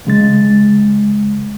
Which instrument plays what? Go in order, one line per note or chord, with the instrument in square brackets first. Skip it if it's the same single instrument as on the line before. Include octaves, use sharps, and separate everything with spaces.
[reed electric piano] C2 C#3 G#3 A6